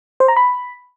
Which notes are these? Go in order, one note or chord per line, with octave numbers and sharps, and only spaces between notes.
C5
A#5
B5